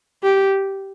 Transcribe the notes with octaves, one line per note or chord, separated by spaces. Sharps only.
G4